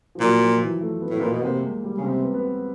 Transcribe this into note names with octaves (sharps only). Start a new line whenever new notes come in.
F3
A#2 F#3
F3
E3
A3
B3
A2
B3
A#2 A#3
B2
C3 A#3
G#3
G3
C#3
C3 C4
B3
B3